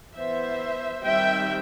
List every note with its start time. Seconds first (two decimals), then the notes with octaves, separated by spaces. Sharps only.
0.15 E3 B3 C5 E5
1.04 D#3 G3 C4 E5 G5